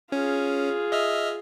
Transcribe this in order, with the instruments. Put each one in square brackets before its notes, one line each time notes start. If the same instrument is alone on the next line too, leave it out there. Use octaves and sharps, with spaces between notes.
[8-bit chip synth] C#4 [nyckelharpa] F4 G#4
[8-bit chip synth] D#5 E5 F6